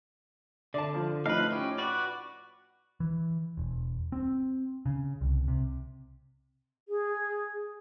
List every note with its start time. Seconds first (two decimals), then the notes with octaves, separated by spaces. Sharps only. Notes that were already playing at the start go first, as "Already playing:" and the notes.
0.74 D3 D5 A5
0.94 F3
1.26 A2 F3 D#4 B4 F5
1.52 C#4 G4
1.78 F#4 B4 D5
3.00 E3
3.57 E1
4.12 C4
4.86 C#3
5.21 C2
5.48 C3
6.88 G#4